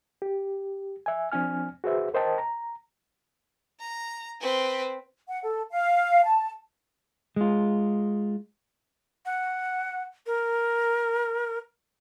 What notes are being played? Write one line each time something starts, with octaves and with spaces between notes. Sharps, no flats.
G4
E5 G#5
F3 C4 D4 G#5 F6
F#4 G#4 B4 C5 E5
A#4 C5 D#5 G5 A5
A#5
A#5
C4 B4
F#5
A4
F5
A5
G#3 F4
F#5
A#4